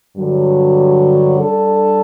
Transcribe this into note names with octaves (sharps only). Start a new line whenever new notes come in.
G2 D3 F#3
G3 D4 A4